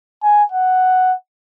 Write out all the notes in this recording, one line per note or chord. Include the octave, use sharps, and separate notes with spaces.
G#5
F#5